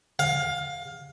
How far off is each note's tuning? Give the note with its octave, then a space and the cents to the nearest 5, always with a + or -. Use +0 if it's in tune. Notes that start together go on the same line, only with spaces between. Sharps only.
F5 +20